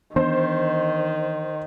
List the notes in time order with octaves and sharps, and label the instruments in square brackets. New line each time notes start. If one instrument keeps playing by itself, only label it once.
[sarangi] D#3 [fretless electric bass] E3 B3 D4 [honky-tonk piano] C5